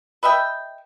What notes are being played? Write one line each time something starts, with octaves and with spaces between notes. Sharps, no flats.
B4 D#5 E5 G5